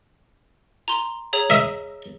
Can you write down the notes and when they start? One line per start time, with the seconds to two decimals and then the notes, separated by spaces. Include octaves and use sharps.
0.88 A#5 C6
1.33 G#4 C#5 A#5
1.50 D#5 E5